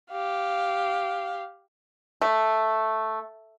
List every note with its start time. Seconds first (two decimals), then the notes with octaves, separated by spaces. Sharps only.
0.11 G4 F5
2.22 A3